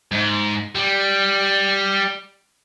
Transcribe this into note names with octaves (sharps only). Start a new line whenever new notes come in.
G#2
G3